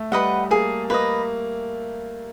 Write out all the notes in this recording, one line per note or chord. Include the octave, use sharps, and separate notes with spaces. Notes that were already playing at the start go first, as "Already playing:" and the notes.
Already playing: A3
G3 B4 D#5 F#5
A#3 G#4
A#3 B4 D#5